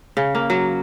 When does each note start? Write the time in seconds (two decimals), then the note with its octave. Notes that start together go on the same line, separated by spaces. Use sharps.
0.17 C#3
0.35 A#3
0.50 F#3